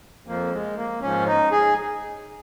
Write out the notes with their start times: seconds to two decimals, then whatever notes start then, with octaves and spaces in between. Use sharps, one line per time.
0.27 F2 F3 A#3
0.52 G#3
0.77 A#3
1.01 G#2 F3 C#4
1.27 D#4
1.52 G#4